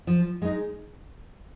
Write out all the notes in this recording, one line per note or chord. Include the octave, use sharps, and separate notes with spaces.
F3
G#3 D#4